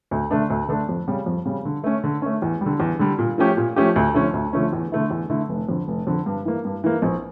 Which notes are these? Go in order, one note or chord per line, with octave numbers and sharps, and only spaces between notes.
D2
D3 A3 D4 A4
D2
D3 A3 D4 A4
F2
C#3 G3
F2
C#3 G3
D3
A3 C#4
D3
A3 C#4
E2
D3 G3
E2
D3 G3
A#2
F3 A3 C#4 G4
A#2
F3 A3 C#4 G4
D2
D3 F3 A3 C#4
D2
D3 F3 A3 C#4
E2
D3 A3 E4
E2
D3 A3 E4
F1
F2 D3
F1
F2 D3
G2
E3 A#3
G2
E3 A#3
A#1